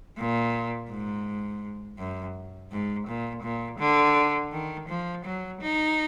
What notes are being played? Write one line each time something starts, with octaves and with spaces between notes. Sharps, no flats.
A#2
G#2
F#2
G#2
A#2
A#2
D3
D#3
F3
F#3
D#4